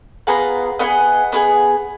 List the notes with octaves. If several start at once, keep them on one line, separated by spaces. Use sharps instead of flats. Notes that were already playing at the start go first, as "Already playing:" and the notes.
B3 F4 G#4 F#5 A#5
B3 F4 G#4 D#5 F#5
B3 F4 G#4